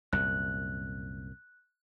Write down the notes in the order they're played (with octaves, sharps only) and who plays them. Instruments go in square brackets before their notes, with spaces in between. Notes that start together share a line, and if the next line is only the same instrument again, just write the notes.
[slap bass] C2 F#2 A#2 [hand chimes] F#6